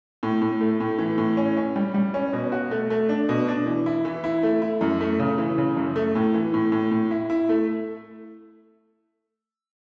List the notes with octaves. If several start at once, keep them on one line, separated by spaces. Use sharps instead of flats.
A2
A2
A3
A2
E3
A2
C#4
C#4
G3
G3
C#4
B2
F#4
A3
A3
D4
B2
D4
E3
E4
E3
E4
A3
E4
F#2
A3
C#3
E3
C#3
F#2
A3
A2
E3
A2
A2
A2
E4
E4
A3